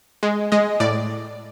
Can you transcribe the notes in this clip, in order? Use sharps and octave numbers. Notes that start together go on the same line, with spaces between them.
G#3
G#3 D#5
A2 D5